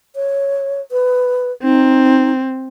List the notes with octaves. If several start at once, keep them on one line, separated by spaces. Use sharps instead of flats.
C#5
B4
C4 D#4